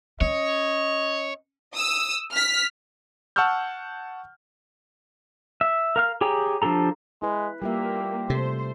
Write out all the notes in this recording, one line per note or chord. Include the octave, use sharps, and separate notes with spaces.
C#4 C#5 D#5
D#6 E6
F6 B6
F#5 A5 C#6 E6 F6 G6
E5
A#4 F5 F6
G4 G#4 C#5 G5 A#5
F3 D4 G4 A4 A#5
G#3 E4 B4
G3 A#3 F4 G4 E5
C3 A3 A4 C5